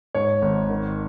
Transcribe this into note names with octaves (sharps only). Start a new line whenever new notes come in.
G#2 C#5
G#1
D#3